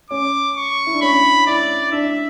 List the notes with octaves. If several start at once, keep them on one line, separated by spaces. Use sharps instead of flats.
C#4 D6
C#6
E4
D4
C#4 B5
E4 D5
D4 E5